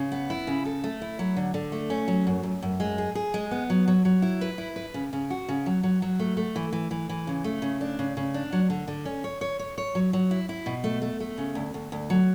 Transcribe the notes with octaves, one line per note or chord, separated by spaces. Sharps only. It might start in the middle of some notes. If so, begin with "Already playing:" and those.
Already playing: C#3
B3
E4
C#3
A4
A3
E4
F#3
D3
D3
A3
C#4
F#3
F#2
F#2
F#2
G#3
G#4
G#4
G#3
B3
F#3
F#3
F#3
E4
B4
E4
B4
C#3
C#3
F#4
C#3
F#3
F#3
F#3
A3
A3
E3
E3
E3
E3
C#3
A3
C#3
D4
C#3
C#3
D4
F#3
D3
D3
C#4
C#5
C#5
C#5
C#5
F#3
F#3
E4
E4
B2
A3
A3
A3
C#3
D2
D2
D2
F#3